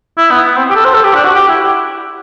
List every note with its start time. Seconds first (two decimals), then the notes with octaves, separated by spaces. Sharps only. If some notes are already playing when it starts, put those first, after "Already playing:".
0.17 E4
0.31 B3
0.47 B3
0.56 C4
0.70 G4
0.75 A4
0.85 C5
0.94 A4
1.04 G4
1.15 D4
1.24 F#4
1.35 G4
1.49 E4